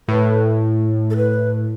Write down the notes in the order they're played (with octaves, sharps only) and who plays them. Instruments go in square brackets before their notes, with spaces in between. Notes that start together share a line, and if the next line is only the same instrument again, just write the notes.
[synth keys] A2 [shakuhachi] B4
[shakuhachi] A4
B4